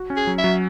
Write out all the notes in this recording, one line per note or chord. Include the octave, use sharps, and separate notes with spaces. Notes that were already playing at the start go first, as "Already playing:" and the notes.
Already playing: F#4
C#4
G#4
F#3
E5
F#3